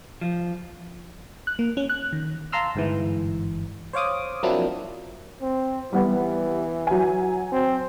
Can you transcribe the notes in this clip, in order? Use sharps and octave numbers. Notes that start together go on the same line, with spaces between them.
F3
F#6
A#3
C#4
F#6
D#3
F5 A5 A#5 C6 E6 F6
G1 G#2 E3
C5 C#5 F5 D6 D#6
F3 F#3 A#3 C4 D4 E4
C4
E3 G3 B3
F#3 G#5
C4